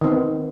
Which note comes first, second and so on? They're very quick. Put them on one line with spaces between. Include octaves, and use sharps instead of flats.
D#3 C4 B3